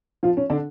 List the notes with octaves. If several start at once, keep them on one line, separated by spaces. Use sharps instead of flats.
F3 F4
C#4
D3 D4